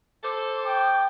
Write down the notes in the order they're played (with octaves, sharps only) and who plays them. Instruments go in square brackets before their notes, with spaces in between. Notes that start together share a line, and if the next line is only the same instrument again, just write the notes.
[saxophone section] A4 C5 [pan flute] D6
[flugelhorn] G5